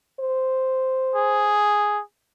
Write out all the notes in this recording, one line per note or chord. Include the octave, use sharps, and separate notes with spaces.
C5
G#4